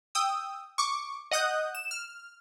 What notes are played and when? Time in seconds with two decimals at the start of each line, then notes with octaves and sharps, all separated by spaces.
0.15 G5 D#6 E6
0.78 C#6 D6
1.31 D#5 F#5 D#6 F#6 G6
1.75 E7
1.91 F6